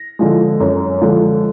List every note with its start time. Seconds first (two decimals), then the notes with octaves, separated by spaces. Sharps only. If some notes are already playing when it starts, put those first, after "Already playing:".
Already playing: A#6
0.19 D3 F3 G#3
0.60 F#2
1.01 D3 F3 G#3